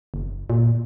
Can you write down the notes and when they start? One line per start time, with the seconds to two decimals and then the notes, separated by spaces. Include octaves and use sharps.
0.14 F#1
0.50 A#2